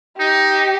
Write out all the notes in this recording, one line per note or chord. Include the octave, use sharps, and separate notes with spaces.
D#4 G4